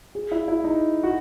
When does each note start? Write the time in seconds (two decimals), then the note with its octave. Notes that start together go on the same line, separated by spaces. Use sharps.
0.15 G#4
0.32 E4
0.48 E4
0.64 D#4
1.03 F#4